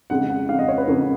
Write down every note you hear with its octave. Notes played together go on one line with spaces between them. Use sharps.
F2 C#3 G#3 F#5
F#5
F2 C#3 G#3 F5
D#5
C#5
B4
F2 C#3 G#3 A#4